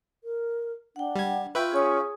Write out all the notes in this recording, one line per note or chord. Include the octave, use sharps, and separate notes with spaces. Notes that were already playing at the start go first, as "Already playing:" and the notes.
A#4
D4 F#5 G5
G3 G#6
F4 B4 E5 G5 C#6
C#4 G#4 G#5 C#6 D#6